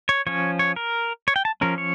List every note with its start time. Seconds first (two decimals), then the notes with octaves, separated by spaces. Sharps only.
0.09 C#5
0.27 F3 C#4 C#5
0.59 C#5
0.76 A#4
1.28 C#5
1.36 G5
1.45 A5
1.61 F3 C#4 A#4
1.78 C#5